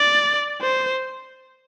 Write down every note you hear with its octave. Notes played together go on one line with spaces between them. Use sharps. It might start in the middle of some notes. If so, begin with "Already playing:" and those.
Already playing: D5
C5